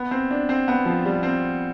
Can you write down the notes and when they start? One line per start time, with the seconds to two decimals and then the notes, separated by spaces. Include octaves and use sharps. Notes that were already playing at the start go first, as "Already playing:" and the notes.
Already playing: B3
0.11 C4
0.31 D4
0.49 C4
0.68 B3
0.85 F3
1.05 G3
1.23 C4